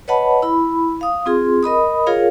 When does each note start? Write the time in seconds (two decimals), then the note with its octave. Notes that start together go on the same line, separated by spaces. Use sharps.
0.08 B4 C#5 D#5 F#5 A5 B5
0.42 E4 B5
1.01 F5 D#6
1.26 C4 F4 G#4 C6
1.63 A#4 D#5 B5 D#6
2.07 F4 G#4 A#4 C#5 F5